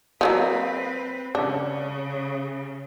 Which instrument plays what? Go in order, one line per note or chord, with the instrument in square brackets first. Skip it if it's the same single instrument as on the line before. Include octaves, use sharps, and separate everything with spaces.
[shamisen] F3 F#3 A#3 [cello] C4 B4
[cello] C#3 [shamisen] D4